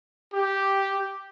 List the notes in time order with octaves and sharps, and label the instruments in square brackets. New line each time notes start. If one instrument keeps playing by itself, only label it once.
[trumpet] G4